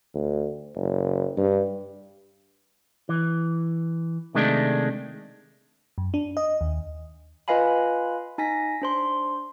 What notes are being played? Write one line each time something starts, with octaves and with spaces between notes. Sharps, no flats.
D2
F#1
G2
E3
C3 D#3 G#3 A3 D4
F#2
D4
D#5
D#2
F4 B4 D#5 F5 G#5 B5
D#4 G#5 A#6 B6
D4 C5 C6